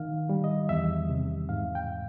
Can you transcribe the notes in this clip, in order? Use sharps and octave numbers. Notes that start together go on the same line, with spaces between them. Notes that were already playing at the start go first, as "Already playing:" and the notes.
Already playing: D#3 F5
G3
D#5
E2 E5
C3
G#2 F5
G5